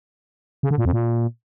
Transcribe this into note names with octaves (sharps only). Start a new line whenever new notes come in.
C#3
D3
A#2
F2
A#2